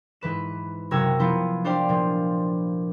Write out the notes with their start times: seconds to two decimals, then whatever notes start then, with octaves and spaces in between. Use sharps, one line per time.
0.21 G#2 E3 B4 E7
0.91 F#1 C3 F#4 A#4 E6 G#6
1.19 F3 B3 E4 F4
1.64 D4 G4 C5 D5 F5 C6
1.89 A#2 F3